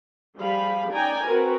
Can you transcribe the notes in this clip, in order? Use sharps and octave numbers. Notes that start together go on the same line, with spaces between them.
F3 G3 G4 G#4 F5 B5
C#4 D#4 D5 G5 G#5 A#5
C4 F#4 A#4 B4